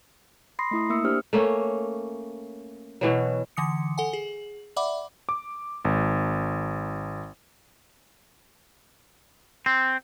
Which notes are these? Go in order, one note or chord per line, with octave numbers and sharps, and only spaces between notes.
B5 C6 D#6 A#6 C7
A3 E4 D#6
A#3 D#6 E6 C#7
D4 G4 C5 F6
A3 A#3 C#4
B2 E3 F#3
D3 E3 D#6 C#7
A4 F#5 G#5
G#4
D5 E5 F#5 B5 D6
D6
G#1
C4